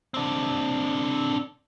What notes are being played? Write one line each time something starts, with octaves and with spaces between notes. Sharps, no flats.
C4 D4